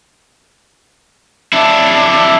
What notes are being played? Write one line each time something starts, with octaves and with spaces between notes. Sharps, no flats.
D4 E4